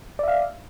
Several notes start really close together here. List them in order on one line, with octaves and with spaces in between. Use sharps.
D5 E5 F5